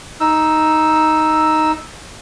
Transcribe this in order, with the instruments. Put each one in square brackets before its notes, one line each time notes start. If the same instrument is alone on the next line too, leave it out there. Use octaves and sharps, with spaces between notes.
[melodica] D#4 E6